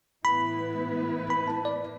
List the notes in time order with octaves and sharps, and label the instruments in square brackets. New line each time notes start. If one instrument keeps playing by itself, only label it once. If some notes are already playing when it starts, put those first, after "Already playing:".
[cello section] A2 E3 B3 E4 B4 [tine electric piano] B5
[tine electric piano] B5
A5
D5